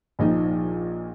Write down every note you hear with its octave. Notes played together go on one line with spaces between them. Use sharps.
A#1 A#2 F3 D#4